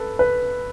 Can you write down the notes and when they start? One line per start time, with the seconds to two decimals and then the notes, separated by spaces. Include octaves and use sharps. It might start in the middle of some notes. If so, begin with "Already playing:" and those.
Already playing: A4 B4
0.19 B4